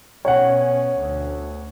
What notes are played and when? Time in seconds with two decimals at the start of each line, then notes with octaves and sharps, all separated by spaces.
0.25 B2 C#4 C#5 F#5
0.98 D2